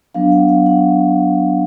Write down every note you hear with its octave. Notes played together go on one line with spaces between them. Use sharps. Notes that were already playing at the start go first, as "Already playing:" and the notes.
F#3 B3 D4 F5
F#5
F5
F#5